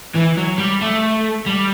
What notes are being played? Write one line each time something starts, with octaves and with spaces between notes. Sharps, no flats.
E3
F#3
G3
A3
G3